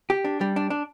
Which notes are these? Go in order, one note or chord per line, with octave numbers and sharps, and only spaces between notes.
G4
D4
G3
D4
D4